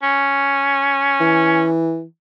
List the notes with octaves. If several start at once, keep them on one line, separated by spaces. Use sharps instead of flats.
C#4
E3